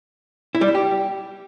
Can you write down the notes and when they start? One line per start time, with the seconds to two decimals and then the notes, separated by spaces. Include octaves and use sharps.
0.55 E4
0.61 G3
0.68 E4
0.75 G4